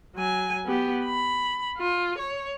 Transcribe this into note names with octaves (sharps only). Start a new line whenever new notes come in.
F#3 G#5
B3 G4
B5
F4
C#5